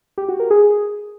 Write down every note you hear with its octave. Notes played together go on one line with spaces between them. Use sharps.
G4
F#4
A#4
G#4